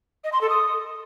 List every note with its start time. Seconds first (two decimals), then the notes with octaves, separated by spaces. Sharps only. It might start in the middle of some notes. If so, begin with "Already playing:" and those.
0.24 D#5
0.33 C6
0.41 A4
0.50 D#6